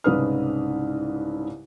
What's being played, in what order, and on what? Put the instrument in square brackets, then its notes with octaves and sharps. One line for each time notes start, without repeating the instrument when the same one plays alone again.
[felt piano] C2 G#2 C#3 B4 D#6 F6